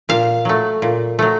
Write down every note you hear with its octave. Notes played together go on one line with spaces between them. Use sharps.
A#2 F5
F#3 A3
A#2
F#3 A3